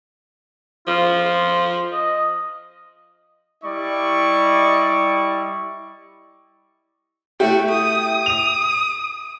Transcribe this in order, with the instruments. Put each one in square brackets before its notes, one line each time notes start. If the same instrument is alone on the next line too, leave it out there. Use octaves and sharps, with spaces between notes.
[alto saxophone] F3 [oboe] F4
[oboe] D#5
[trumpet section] G3 E4 D5 D#5 C#6
[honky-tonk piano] A3 E4 G4 [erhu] F#4
[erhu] D#6
[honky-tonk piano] D#7 F7